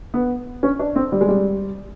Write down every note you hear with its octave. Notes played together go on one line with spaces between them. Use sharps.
B3
C#4
D4
C4
G3
G#3
G3